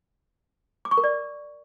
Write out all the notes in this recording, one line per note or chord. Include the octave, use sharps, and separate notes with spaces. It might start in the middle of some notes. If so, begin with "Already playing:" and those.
D6
C#6
A#4
D5